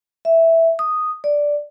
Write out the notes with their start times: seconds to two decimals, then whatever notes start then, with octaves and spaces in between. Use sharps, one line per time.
0.25 E5
0.79 D#6
1.24 D5